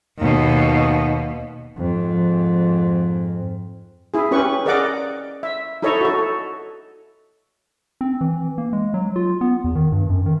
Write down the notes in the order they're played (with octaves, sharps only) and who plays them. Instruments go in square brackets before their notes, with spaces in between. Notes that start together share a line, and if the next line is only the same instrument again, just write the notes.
[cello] D#2 B2
[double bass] F2 G#2
[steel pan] E4 G#4
C#4 G4 B4 C#6
G#4 A#4 D5 D#5 F#5 D6
E5
D#4 E4 A4 C#5 D#5
F#4 A4
[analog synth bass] C4
E3
A#3
G#3
F#3
F4
B3
E2
D#3
G2
F#2
D#3